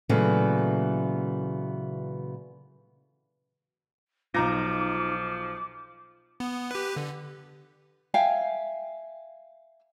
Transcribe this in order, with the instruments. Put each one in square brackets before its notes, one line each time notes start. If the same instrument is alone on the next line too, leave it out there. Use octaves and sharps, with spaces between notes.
[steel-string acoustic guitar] A#2 C#3 E3 F#3 A3 B3
[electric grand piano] B1 A#5 A#6 [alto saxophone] F3 [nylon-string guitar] D#4 F4 [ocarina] D6
[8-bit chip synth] B3
G4 B4
D3
[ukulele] E5 F5 G5 G#5